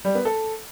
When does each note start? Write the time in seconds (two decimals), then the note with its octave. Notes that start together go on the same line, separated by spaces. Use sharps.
0.05 G3
0.15 B3
0.25 A4